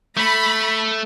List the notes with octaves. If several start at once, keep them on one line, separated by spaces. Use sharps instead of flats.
A3 B5